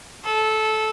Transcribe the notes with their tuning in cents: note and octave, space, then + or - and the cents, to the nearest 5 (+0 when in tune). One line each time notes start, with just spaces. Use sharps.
A4 -15